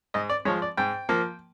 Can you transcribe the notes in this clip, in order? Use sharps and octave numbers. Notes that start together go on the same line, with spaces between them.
G#2 D#5
D5
F3 G#3 C#5
D5
G#2 G5
F3 A#3